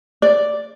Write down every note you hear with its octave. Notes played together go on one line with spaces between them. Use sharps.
D5